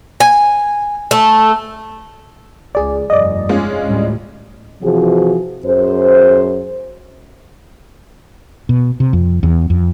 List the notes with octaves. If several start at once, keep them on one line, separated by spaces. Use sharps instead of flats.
G#5
A3
C#2 G#4 D5
F1 G2 D5 D#5
G#3 C#4 F4
D2 A2 G3
C3 E3 F3 F#4 G#4
F#2 G#4 C5
B2
C3
F2
E2
F2